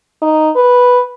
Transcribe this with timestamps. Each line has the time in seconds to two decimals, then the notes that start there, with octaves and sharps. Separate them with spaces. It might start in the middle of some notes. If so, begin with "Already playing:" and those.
0.22 D#4
0.56 B4